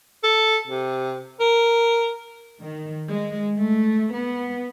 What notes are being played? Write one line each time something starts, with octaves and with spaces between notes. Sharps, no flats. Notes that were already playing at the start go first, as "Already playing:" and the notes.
A4
C3
A#4
D#3
G#3
A3
B3